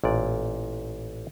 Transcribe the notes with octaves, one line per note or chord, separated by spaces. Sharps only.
A1 A#2 D5